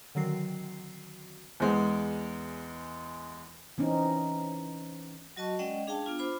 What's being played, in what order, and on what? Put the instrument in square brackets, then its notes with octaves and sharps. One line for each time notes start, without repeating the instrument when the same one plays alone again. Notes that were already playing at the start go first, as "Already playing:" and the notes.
[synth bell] D3 D#3 F#3 C4 F#4 C7
[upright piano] E2 G#3
[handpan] E3 C4 C#4 D#4
[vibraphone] F#3 F#4 D#5 A5 C#6
G#3 C#4 D5 D#5 F#5 G5
D4 G#4 F5 G5 A5
B3 D4 F4
F4 C5 B5 D6